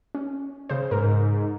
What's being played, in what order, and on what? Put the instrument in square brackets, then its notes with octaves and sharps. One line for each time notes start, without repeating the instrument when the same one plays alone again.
[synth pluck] C#4
C#3 C5
[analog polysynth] G#2 [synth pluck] A#4